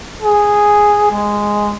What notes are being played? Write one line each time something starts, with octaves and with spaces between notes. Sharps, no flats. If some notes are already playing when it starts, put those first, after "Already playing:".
G#4
G#3